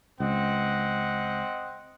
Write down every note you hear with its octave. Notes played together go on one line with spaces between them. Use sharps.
C#2 C4 D#5 F#5